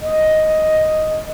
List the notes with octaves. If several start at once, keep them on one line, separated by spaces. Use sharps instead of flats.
D#5